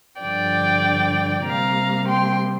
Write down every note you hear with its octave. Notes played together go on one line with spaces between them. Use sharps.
G2 D3 F3 D5 G5
C3 G3 A#3 F5 A#5
G5 C6